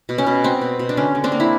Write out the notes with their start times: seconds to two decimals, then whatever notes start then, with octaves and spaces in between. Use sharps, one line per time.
0.09 B2
0.18 C#4
0.26 B2
0.44 B3 C4
0.61 B2
0.79 B2
0.89 D4
0.97 D3 C#4
1.15 D3
1.24 C4 D4
1.32 A#3
1.40 E4